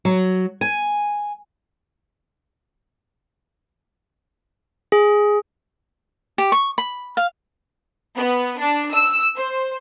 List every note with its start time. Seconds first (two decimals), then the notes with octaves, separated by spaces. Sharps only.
0.05 F#3
0.61 G#5
4.92 G#4
6.38 G4
6.52 C#6
6.78 B5
7.17 F5
8.16 B3
8.59 D4
8.94 E6
9.37 C5